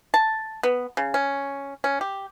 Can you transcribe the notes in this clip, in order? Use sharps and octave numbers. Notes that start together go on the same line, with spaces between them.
A5
B3
C#3
C#4
C#4
G4